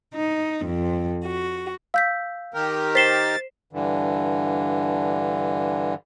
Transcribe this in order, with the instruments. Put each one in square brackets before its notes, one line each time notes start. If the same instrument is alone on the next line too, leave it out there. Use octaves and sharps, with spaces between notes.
[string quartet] D#4
F2
F#4
[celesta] F5 [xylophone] E6 G6 B6
[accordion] D#3 G4 A#4
[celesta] C5 C7 E7 [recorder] A6 [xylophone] B6 G7
[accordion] G2 D3 E3